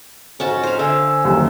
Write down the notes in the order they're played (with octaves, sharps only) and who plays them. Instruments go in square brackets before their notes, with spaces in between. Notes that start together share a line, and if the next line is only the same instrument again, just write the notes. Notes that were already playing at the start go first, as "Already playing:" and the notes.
[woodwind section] F2 G#2 [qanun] C#4 F#4 A5
[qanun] C5 F5
[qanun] D3 [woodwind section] G#5 E6
[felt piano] F#1 D#2